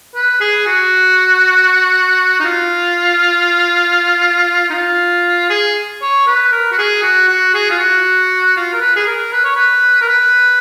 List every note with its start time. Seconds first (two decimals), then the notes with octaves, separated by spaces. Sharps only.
0.15 B4
0.41 G#4
0.66 F#4
2.40 D#4
2.45 F4
4.70 D#4
4.74 F4
5.50 G#4
6.02 C#5
6.27 B4
6.52 A#4
6.72 F#4
6.78 G#4
7.02 F#4
7.28 F#4
7.54 G#4
7.70 F4
7.79 F#4
8.56 F4
8.74 A#4
8.81 B4
8.96 G#4
9.06 A#4
9.33 B4
9.44 C#5
9.55 B4
10.01 A#4
10.08 B4